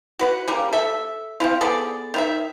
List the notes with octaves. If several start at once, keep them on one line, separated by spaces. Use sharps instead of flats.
F#4 B4 F#5
C#3 G3 A#3
A4 E5
C4 D4 E4 F4
B3 G#4 A4 D5
D#3 E4 E5